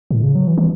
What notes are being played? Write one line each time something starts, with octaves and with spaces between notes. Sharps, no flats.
A2
C#3
F#3
E3
E3